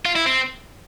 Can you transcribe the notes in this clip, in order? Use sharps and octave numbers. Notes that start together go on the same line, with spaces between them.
F4
E4
C4